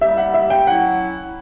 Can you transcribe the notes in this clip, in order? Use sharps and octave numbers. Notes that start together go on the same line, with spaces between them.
G3 A#3 E4 G4 E5
F#5
E5
G5
F#3 C#4 E4 F#5